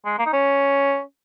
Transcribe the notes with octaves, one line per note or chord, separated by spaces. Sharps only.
G#3
A#3
D#4
C#4